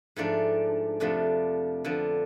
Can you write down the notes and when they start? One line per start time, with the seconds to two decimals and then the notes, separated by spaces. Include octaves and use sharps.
0.16 G#2 F3 A3 D4
1.00 F2 C3 F3 A3 D4
1.85 D3 F3 B3 D4